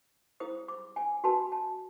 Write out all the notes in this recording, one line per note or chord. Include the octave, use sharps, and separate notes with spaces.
E4 G#4 C5 D#6
D6
G#5
F#4 B4 A5
A5